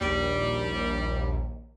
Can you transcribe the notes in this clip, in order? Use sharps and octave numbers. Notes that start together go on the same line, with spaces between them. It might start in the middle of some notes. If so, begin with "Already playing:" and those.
A#1 D#2 G3